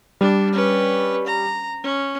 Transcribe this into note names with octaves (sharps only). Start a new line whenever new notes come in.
G3 D4
C#4 B4
A#5
C#4